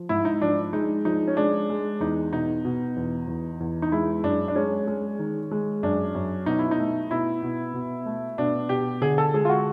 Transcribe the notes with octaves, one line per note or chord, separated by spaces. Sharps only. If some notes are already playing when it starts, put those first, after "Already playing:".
Already playing: F3
G#2 E4
D#4
F3 D4
G#3 D#4
F3 D#4
C#4
G#3 D4
G#3
E2 D#4
B2 D#4
B2
E2
E2
E2
D#4
G#3 E4
F#2 D4
D4
G#3 C#4
G#3
D#3
G#3
F#2 D4
F#2
B2 D#4
E4
D#4
A3
B2 E4
B2
B2
A3
B2 D4
B2 G4
D3 G#4
A4
G#3 G#4
F4
F#4